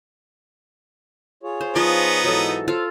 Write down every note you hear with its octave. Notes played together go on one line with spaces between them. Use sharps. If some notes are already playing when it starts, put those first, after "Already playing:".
F4 G#4 C#5
C5
F3 B3 D#4
G#2 E3 F#3 A4
F4 A4 C5 F5